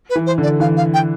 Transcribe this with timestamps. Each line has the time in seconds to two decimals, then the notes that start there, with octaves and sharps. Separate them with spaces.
0.10 B4
0.15 E3
0.27 C5
0.38 D3
0.43 D5
0.60 E3 F5
0.77 F5
0.94 G5